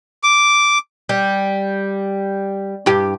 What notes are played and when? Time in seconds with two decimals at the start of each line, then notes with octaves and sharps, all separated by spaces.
0.23 D6
1.09 G3
2.86 G2 G4